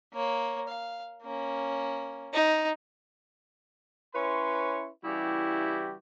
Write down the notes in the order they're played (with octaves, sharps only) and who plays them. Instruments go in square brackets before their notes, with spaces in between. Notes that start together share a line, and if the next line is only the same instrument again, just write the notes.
[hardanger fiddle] A#3 C#5
F5
A#3 C#4
[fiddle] D#4
[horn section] C#4 E4 B4 C#5 C6
C#3 E3 G3 E4 F#4 G4